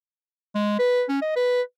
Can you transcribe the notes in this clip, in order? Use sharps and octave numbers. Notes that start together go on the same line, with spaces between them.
G#3
B4
C#4
D#5
B4